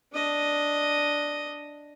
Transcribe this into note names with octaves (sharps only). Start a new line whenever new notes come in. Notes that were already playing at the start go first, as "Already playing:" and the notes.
D4 D#5